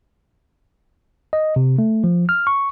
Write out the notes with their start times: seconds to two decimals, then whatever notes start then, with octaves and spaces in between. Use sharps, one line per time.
1.33 D#5
1.56 C3
1.79 A3
2.04 F3
2.29 F6
2.47 C#6